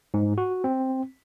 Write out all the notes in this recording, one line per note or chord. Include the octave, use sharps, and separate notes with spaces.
G#2
F#4
C4